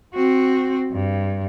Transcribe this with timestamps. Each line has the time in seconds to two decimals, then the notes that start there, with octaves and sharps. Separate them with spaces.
0.14 C4 F#4
0.91 G2